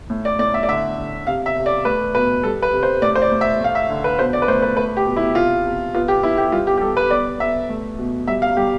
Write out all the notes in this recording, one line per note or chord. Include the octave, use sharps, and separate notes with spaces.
A2
D5
A2 D5
E5
D5
D3 E5
D3
C3 F5
E5
C3
D5
A3 B4
B2 B4
G3 A4
B4
C3
C5
A2 D5
C5
D5
A2
E5
A3 F5
E5
D3
B4
B2 C5
D5
B4
A3 C5
B4
A3 B4
G4
B2
E4
C3 F4
C3
B3 F4
G4
B3 E4
G4
G3 F4
G4
G4
G3 A4
B4
B3 D5
B3 E5
A3
B2
G3 E5
F5
G3 G4